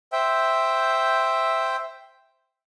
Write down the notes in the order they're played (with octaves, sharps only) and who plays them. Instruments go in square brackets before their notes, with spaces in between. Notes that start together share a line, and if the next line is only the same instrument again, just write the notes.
[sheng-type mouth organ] C5 E5 G5